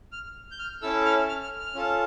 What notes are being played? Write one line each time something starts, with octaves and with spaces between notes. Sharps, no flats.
F6
G6
F6
C#4 E4 A4 E6
F6
F6
F6
F6
C#4 F4 A4